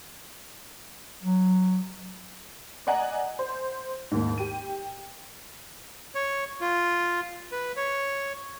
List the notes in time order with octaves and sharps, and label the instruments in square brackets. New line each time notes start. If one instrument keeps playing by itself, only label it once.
[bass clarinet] F#3
[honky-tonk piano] D5 D#5 F#5 G#5 A#5
C5
D#2 G#2
G4 D#7
[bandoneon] C#5
F4
B4
C#5